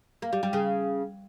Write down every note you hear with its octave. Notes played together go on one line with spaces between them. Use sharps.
A#3
G3
G3
C#3